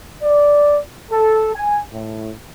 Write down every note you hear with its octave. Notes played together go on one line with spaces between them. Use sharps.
D5
A4
G#5
A2